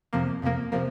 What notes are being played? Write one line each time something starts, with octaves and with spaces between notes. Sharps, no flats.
F2 C3 F3 A#3
F2 C3 F3 A#3
C3 F3 A#3